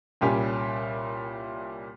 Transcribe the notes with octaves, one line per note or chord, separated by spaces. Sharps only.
C2 A#2 G3 C#4 G4